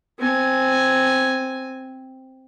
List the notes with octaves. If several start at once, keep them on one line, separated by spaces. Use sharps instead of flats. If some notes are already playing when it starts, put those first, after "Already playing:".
C4 G#5